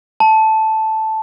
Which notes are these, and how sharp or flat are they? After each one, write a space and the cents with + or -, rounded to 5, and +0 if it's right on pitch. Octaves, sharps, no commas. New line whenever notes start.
A5 -5